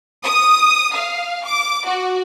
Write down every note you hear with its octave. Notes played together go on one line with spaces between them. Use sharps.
D#6
F5
D6
F#4